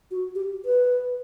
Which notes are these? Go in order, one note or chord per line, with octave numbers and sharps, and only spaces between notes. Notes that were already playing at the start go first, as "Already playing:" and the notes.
F#4
G4
B4